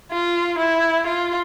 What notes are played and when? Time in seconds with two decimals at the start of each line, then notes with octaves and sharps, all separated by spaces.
0.12 F4
0.59 E4
1.07 F4